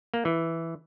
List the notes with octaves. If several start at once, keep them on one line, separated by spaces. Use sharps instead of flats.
A#3
E3